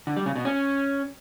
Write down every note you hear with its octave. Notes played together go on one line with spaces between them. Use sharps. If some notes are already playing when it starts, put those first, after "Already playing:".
D3
G3
C#3
B2
C#4